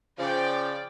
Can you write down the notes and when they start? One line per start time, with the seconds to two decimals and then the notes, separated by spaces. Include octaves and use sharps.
0.19 C#3 F3 D5 G5